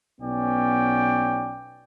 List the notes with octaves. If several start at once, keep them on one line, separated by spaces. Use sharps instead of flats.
B1 B3 C#4 D5 G5